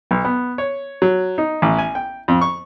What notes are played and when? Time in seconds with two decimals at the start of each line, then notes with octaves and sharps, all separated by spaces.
0.11 B1
0.25 B3
0.58 C#5
1.02 F#3
1.38 D#4
1.62 A1
1.79 G#5
1.95 G5
2.28 F2
2.41 C#6